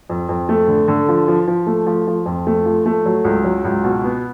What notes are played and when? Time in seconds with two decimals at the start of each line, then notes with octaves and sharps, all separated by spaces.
0.10 F2
0.29 F2
0.49 A3
0.68 D3
0.88 D3
1.08 F3
1.28 F3
1.47 F3
1.67 A3
1.86 F3
2.07 F3
2.26 F2
2.47 A3
2.65 F3
2.86 A3
3.06 F#3
3.25 C#2
3.44 F#3
3.65 C#2
3.84 B2
4.04 B3